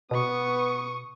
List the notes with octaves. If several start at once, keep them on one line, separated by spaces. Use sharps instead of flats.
B2 B3 C#6 D#6